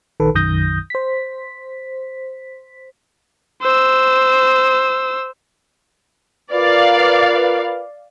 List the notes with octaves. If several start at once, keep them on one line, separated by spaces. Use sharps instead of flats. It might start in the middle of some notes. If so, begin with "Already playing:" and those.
A#1 D#3 A4 B4
B1 F#2 D#3 D#6 G6 A#6
C5 B6
C5 E6
F4 A#4 B4 D5 F5